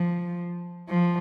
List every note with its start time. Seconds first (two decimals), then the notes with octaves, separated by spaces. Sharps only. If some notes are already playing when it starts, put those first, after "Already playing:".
Already playing: F3
0.90 F3